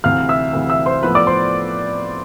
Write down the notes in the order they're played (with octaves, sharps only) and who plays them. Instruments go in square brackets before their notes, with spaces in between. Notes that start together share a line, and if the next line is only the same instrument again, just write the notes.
[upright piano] D2 C3 E3 F5 F6
E5 E6
D2 C3 E3
E5 E6
C5 C6
A2 F3 B3 B4 B5
D5 D6
C5 C6